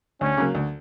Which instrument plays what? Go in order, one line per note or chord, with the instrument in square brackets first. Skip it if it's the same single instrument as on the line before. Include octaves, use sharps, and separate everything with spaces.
[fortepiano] D2 [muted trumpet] C#4
[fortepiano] C#3 F#3 A#3
D2